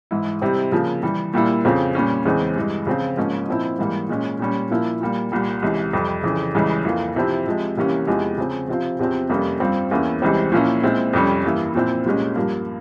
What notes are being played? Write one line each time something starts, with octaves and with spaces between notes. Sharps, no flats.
G#2 E3 G#3 E4
C3 G3 C4 E4
C#3 F3 A#3
C3 E3 G3
A#2 G3 A#3 E4
F2 C#3 F3 C4 F4
A#2 G3 C#4
E2 C#3 E3 G#3 C4
G2 E3 G#3
C#3 F3 C4 F4
G#2 F3 A#3 C#4
A#2 F3 C4 E4
G#2 E3 G3 A#3
A#2 G#3 C#4
A#2 G3 C#4
A#2 F3 A#3 E4
A#2 G3 A#3
C2 A#2 G3
C#2 C3 E3
F2 C3 G3
F2 C#3 E3
C#2 C#3 E3 G3
F2 E3 A#3 F4
C3 F3 C4 E4
C3 F3 G#3
C2 C3 E3 A#3 C#4
E2 C3 F3 G#3 E4
C#3 F3 C4
C3 F3 C4 F4
E2 C3 F3 C4
F2 C3 G3 A#3 C#4
G2 G3 C4 F4
E2 E3 A#3 C#4 E4
C#2 C3 E3 G3 C4
A#2 F3 A#3 C#4 E4
A#2 G#3 C4 E4
F2 C3 G3 C#4
G2 E3 A#3 E4
A#2 F3 C4 E4
C2 A#2 G#3 C#4
G2 F3 A#3